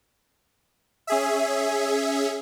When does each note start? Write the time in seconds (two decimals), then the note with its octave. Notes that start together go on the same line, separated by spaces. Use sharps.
1.07 C#4 G#4 E5